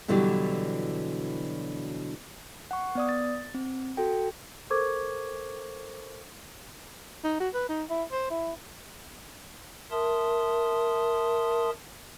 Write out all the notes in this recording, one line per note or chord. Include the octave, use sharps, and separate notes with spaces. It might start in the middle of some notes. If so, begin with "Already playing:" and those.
B2 D3 E3 F#3 G3
F#5 C#6
B3 D5 D#6
A6
C4
F#4 A4 G5
A4 A#4 C5 C#6 D6 G#6
D#4
F#4
B4
D#4
E4
C5
E4
A#4 E5 A5 C6 D#6